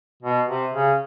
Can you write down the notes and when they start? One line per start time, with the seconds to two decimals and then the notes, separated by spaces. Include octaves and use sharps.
0.22 B2
0.48 C3
0.73 C#3